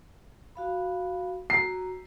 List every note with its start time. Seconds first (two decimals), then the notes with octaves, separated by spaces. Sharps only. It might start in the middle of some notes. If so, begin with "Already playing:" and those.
0.56 F#4 F5 B5
1.50 F#4 A#5 C7